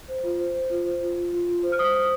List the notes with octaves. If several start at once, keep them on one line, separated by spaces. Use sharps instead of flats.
C5
F4
C5
C5
F4
C5
F4
F4
F4
F4
C5
F6
C5 D#6
C5 D#6